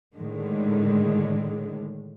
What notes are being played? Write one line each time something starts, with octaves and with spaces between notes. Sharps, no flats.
A2 D3 D#3 G#3